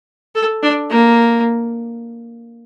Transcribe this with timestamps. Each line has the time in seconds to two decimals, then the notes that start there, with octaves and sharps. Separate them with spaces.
0.35 A4
0.63 D4
0.90 A#3